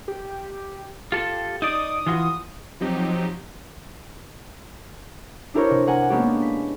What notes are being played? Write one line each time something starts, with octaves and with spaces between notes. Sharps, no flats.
G4
F4 G4 A4
D#4 D5 D#6
E3 F4 F#4
F3 F#3 C4 D#4 G4
D4 E4 G4 A#4 C5 C#5
C3
A#4 F#5 G#5
G#3 A#3 B3 C#4 D4 G4
B6